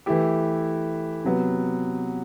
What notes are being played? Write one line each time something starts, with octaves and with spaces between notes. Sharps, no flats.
E3 A3 E4 G4
C3 F#3 B3